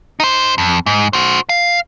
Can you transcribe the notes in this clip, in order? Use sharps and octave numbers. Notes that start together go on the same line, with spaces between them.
D#4 C5
F2
G#2
F#4 C5
F5